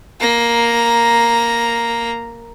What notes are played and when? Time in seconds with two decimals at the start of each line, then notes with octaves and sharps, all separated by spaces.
0.20 A#3 A#5